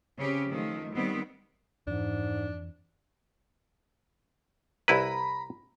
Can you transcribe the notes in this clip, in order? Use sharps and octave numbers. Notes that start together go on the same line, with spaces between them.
C#3 C4 C#4 G4
D#3 F3 A3
D#3 G3 B3 C4
F2 G#2 E3 D4
C2 E4 B4 A#5 B5